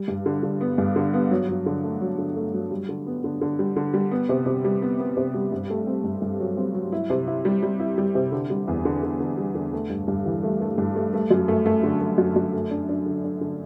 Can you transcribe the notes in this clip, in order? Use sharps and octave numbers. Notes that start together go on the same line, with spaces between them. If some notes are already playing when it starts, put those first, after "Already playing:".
Already playing: G3
G2
D3
D3
B3
G2
D3
B3
F#3
F#3
D3
A3
F#3
D3
A3
F#3
G3
D3
B3
D3
D3
G3
D3
G3
B3
C3
C3
G3
B3
B3
C3
G3
G2
A3
C4
G2
G2
F#3
C4
F#3
E4
C3
E4
G3
G3
E4
G3
C3
D3
G3
E2
D3
D3
D3
G3
D3
A3
G2
G2
E3
A3
A3
G2
A3
A3
F#2
A3
A3
D3
A3
F#2
F#2
A3
D4
D4
D3
D4
D3